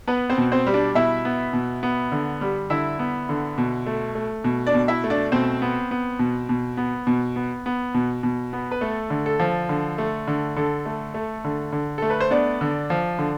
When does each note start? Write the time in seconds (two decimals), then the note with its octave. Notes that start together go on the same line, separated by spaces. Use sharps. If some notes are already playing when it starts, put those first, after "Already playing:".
0.07 B3 B4
0.30 C4 C5
0.38 B2
0.52 C4 C5
0.66 G3
0.74 D4 D5
0.95 B2 E4 E5
1.25 B3
1.53 B2
1.83 B3
2.12 D3
2.41 G3
2.70 D3 E4 E5
2.99 B3
3.29 D3
3.58 B2
3.86 A3
4.15 A3
4.44 B2
4.67 D4 D5
4.74 B2
4.88 E4 E5
5.04 A3
5.10 D4 D5
5.32 B2 C4 C5
5.62 B3
5.91 B3
6.19 B2
6.49 B2
6.77 B3
7.07 B2
7.36 B3
7.66 B3
7.94 B2
8.23 B2
8.53 B3
8.71 B4
8.81 A3 A4
9.10 D3
9.26 A4
9.39 F3
9.69 D3
9.98 A3
10.27 D3
10.56 D3 A4
10.86 A3
11.14 A3
11.44 D3
11.72 D3
11.98 A3 A4
12.10 B4
12.20 C5
12.31 B3 D4 D5
12.61 D3
12.90 F3
13.19 D3